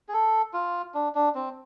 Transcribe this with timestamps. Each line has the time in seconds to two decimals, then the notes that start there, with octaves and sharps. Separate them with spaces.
0.09 G#4
0.13 A4
0.54 F4
0.94 D4
1.15 D4
1.35 C4